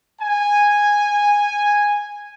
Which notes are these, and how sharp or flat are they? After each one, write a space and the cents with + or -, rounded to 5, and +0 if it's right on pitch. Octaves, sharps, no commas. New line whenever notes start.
G#5 -10